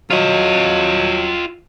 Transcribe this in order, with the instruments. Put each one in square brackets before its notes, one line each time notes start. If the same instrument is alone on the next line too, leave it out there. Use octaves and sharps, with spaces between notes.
[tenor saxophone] F#3 [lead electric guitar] F4 D#5